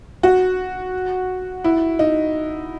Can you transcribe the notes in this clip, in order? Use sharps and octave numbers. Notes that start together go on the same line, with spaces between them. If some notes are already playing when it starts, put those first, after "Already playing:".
F#4
E4
D#4